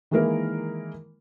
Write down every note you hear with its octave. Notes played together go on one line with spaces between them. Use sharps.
D#3 E3 G#3 A#3 E4 A#4